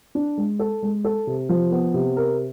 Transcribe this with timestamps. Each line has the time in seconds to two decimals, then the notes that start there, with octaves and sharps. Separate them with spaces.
0.15 D4
0.38 G#3
0.59 A4
0.83 G#3
1.04 A4
1.27 C3
1.49 F3
1.71 B3
1.94 C3
2.17 A#4